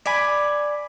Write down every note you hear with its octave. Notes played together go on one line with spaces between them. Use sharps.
D5 G#5 B5